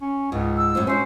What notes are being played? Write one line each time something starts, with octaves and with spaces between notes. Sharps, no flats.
C#4
C#2 G#2
E6
F#2 A2 F3 G#3
C#4 F#4 C5